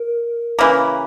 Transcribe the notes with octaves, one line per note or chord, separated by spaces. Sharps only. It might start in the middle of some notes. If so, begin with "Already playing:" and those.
Already playing: A#4
C#3 E3 A#3